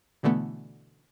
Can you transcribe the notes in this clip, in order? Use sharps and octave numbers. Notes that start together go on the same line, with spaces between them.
B2 D3 E3 A3 B3